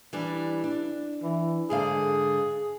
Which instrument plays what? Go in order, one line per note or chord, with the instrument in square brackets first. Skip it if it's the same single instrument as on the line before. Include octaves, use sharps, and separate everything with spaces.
[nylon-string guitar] E3 G3 D4
D4
[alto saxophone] E3
[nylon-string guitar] G#2 D3 F5 [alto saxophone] G#4